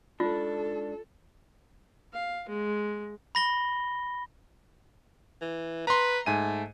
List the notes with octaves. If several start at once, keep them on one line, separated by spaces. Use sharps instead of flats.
G#2 D4 F4 A4
F5
G#3
B5 A#6 G7
E3
B4 A#5 C6
G#2 A3 G#5 D#7